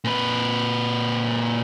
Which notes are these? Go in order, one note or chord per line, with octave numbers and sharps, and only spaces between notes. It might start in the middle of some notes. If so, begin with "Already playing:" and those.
A#2 B4